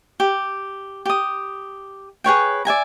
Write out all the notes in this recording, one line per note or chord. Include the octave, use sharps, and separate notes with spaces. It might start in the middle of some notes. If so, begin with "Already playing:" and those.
G4
G4 D#6
G#4 B4 C#5 G5
D5 E5 G#5 A#5